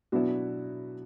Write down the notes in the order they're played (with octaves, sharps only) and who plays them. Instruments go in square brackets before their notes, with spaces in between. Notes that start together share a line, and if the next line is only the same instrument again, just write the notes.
[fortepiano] B2 F#3 B3 E4 [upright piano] D4 F#4